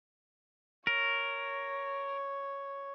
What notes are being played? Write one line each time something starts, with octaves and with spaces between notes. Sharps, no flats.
A#4 C#5